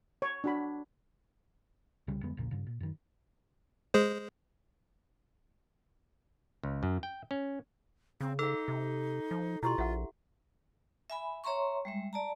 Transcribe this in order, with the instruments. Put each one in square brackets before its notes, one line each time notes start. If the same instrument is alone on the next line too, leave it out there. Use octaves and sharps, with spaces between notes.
[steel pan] C#5
D4 F#4 B5
[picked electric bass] C2 C#3 G3
F2 D3 G#3 B3
E1 A#1 A#2 C#3
G2 C#3
A#2
F#2 D#3
[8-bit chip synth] G#3 G#4 C5
[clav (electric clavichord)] C#2
F#2
G5
C#4
[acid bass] C#3 [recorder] C4
[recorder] D#4 [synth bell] A4 [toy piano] F5 E6
[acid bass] C3
F3
[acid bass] B2 [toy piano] E4 G4 C6 [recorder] F4
[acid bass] A#1 [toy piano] E5 F#5
[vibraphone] E5 G#5 B5
C#5 E5 A#5 C6 C#6
G3 G#3 E5
D5 A5 A#5